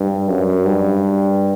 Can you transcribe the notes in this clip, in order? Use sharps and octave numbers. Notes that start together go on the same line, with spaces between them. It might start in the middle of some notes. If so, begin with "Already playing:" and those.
Already playing: G2
F#2
G2